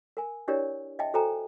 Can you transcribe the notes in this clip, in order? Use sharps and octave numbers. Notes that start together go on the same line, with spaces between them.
A#4 G#5
D4 E4 G4 A#4 C#5 D5
D#5 E5 G5 A5
F#4 A4 C5 G5 G#5 A#5